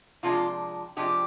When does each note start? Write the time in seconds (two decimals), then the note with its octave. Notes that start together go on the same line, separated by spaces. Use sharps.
0.23 C3 F3 G#3 D4 F4
0.97 C3 F3 G#3 D4 G4